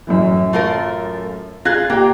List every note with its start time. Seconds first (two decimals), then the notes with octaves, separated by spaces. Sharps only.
0.07 F#2 A2 E3
0.53 A3 F4 A#4
1.65 F4 G#4 F#6 G#6 A#6
1.90 A#3 G4 G5